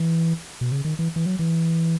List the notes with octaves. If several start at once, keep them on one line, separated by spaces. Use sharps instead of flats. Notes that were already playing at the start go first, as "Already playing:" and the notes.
Already playing: E3
B2
C#3
D#3
E3
E3
F#3
E3